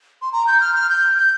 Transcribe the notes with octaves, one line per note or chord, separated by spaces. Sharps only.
C6
A#5
G6
F6
F6
G6
G6